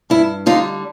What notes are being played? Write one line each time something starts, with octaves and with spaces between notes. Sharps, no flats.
G2 E4
D3 G3 D#4 F4